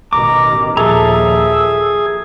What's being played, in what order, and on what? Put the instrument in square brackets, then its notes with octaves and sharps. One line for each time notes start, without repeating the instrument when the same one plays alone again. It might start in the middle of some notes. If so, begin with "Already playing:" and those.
[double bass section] A1 B2 D#3 [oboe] A#5 [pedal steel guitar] D6
[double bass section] D#2 A#2 F3 [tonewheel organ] G#4 [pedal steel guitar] A4 A#5 [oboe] E5